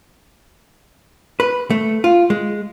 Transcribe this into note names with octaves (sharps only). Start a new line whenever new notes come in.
B4
A3
F4
G#3